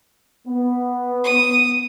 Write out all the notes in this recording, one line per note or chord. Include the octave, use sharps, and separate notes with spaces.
B3
D#6